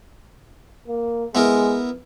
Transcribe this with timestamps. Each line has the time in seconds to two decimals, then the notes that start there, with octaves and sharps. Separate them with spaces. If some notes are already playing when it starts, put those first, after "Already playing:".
0.88 A#3
1.35 G#3 B3 E4 A#4